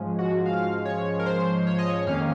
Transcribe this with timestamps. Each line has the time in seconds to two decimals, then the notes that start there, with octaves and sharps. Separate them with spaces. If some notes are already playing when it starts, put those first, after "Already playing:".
Already playing: G#2 F3 G#3 C#4
0.19 F#4
0.46 F5
0.85 C#5
1.19 A#4
1.26 C5
1.67 C#5
1.79 D#5
1.90 C#5
2.07 F2 D#3 A#3 C#4 F5